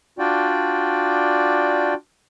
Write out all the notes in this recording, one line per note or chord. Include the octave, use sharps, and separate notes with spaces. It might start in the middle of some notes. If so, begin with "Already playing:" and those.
D4 F4 F#4 D5 G5